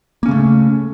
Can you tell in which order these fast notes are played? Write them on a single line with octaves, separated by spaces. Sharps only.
A#3 C#4 C#3 A3